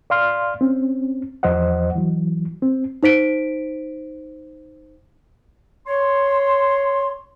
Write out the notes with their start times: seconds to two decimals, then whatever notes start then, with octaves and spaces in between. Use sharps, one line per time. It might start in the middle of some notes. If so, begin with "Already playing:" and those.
0.10 D5 F5 C6 F6
0.61 C4 C#4
1.43 E2 F3 C5 D#5 F#5
1.95 E3 F#3
2.62 C4
3.03 D#4 C5 B6 D7
5.87 C#5 C6